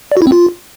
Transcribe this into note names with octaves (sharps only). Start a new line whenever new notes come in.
D5
F#4
E4
C4
F4